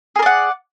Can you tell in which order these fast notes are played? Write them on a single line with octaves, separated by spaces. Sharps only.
G#4 A#4 D5 F#5